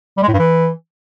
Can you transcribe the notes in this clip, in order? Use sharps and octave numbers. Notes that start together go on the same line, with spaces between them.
G3
G#3
A2
G2
E3